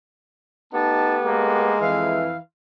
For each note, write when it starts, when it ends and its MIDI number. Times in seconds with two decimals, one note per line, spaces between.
0.73 1.73 57
0.73 1.73 59
0.73 1.17 63
0.73 1.73 67
0.73 1.16 81
1.25 2.19 56
1.25 1.76 58
1.81 2.34 41
1.81 2.34 52
1.81 2.39 77